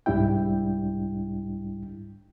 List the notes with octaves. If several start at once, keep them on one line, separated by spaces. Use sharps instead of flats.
C2 G#2 G3 D4 E4 G5